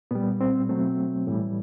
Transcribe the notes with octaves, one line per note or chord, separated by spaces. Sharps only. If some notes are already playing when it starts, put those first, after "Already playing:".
A#2 G3 B3
C4
B2 F#3 A3 C4
A2 E3 G3